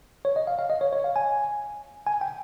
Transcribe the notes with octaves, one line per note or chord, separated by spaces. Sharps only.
C#5
D#5
F5
F5
D#5
C#5
C#5
F5
G#5
G#5
G5